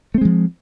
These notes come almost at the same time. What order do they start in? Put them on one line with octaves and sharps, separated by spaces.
A3 C4 G#3 F3